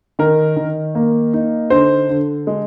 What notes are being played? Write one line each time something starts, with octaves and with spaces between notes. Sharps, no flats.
D#3 A#4
D#3
A#3
D#4
D3 C5
D3
G#3